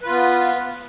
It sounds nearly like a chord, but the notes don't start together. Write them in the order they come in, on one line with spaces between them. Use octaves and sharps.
B4 F4 B3